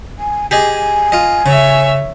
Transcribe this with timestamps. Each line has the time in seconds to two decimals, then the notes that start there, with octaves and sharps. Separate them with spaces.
0.19 G#5
0.51 G4 G#4 D#5 G#5
1.12 F4 D#5
1.46 C#3 C#5 E5